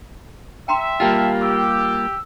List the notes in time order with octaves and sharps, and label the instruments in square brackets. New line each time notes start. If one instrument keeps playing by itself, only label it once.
[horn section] E5 [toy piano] G5 A#5 C6
[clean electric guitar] G3 A#3 F4 [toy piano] G4 G5 [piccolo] A5
[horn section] G4 [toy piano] C#6 [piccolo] E6